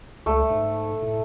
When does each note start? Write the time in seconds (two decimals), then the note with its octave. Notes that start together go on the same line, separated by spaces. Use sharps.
0.26 C#2 A3
0.50 G#2
1.02 A2